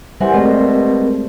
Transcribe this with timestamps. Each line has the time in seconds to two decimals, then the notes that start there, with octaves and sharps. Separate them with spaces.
0.21 E3 G3 A#4 C5 F#5 G#5
0.34 B2 G#3 A3 C4 A#4